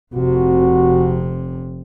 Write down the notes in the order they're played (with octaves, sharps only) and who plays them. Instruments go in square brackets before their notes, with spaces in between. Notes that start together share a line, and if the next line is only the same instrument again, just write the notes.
[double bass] F1 C3 [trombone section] F#4